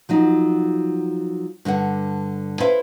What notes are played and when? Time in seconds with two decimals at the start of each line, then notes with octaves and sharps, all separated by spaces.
0.09 F3 F#3 D#4
1.65 G2 D3 G3 F#5
2.60 E4 B4 C5 E5 F5